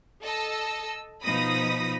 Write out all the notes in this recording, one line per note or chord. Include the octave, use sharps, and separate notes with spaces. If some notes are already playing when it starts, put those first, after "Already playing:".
A4 D#5 A5 E6
B2 F3 D#4 B5 D#6 A#6